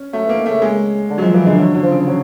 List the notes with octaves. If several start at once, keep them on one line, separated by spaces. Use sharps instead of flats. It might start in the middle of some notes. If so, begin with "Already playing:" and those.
Already playing: C#4
F#3 A3
E3 A#3
D#3
C#3 A3
G#3
D3
F#3
F3 G#3
E3 A#3
D3 G#3
D3 F#3
D3 F#3
F3
C#3
F3
D3 F#3